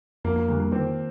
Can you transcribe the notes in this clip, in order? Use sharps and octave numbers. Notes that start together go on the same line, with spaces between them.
F2 A#3
A#3
D3 G3 A#3
A#3
D#3 C4